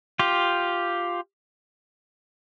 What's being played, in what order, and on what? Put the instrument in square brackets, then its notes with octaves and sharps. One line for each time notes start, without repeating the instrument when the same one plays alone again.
[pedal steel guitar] F4 G4